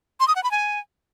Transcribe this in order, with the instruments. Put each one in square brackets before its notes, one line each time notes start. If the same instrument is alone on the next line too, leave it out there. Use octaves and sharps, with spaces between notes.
[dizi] C6
D#6
F#5
B5
G#5